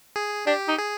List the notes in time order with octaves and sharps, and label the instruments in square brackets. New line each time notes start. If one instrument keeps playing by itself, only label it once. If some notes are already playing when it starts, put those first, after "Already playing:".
[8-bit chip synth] G#4
[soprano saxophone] D4 [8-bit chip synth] G4
[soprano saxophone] D#4
[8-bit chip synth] G#4